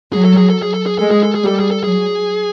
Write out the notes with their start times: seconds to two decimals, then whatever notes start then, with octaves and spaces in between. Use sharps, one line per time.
0.13 F#3 G#4
0.25 A4
0.37 G#4
0.50 A4
0.62 G#4
0.74 A4
0.86 G#4
0.99 G#3 A4
1.11 G#4
1.23 A4
1.35 G#4
1.44 G3 A4
1.60 G#4
1.71 A4
1.84 F#3 G#4